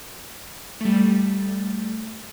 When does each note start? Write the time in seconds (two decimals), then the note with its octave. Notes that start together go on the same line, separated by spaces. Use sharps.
0.81 G3 A3